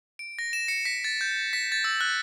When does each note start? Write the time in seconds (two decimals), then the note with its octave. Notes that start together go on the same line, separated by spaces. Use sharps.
0.19 D7
0.39 A#6
0.53 E7
0.68 C#7
0.85 B6
1.04 A6
1.21 G6
1.53 B6
1.72 A6
1.84 E6
2.01 F#6